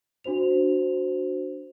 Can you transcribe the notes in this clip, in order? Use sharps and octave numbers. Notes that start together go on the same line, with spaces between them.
D4 F#4 C5 F7